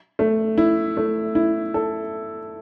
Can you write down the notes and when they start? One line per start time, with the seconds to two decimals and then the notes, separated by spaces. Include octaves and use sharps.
0.19 A3
0.58 E4
0.97 A3
1.35 E4
1.74 A4